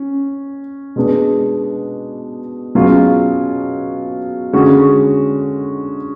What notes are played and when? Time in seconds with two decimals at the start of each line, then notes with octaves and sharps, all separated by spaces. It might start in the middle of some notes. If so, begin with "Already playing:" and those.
Already playing: C#4
0.96 B2 G#3 B3 D4
2.75 B2 F#3 C#4 F4 G#4
4.53 D3 G#3 C#4 F#4